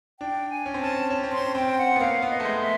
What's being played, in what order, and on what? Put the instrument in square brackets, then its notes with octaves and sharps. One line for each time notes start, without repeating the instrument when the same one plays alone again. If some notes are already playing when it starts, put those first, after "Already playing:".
[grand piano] D4 [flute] G5
[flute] G#5
[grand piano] C#4
C4
[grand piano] C#4 [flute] A5
[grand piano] C#4
C4
[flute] C6
[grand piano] C#4
[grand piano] C4 [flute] G5
[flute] F#5
[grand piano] B3
[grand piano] A#3 [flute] F5
[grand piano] B3
[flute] D#5
[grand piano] A3
G#3
[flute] E5